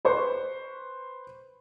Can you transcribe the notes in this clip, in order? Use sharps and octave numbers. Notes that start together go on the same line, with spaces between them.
B4 C5 C#6